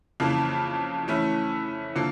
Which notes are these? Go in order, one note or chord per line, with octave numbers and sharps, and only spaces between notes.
F2 C#3 E3 A#3
E3 A3 C#4 E4
D3 F3 A#3